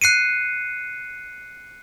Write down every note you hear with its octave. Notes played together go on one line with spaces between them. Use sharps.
F#6 C7 C#7 D#7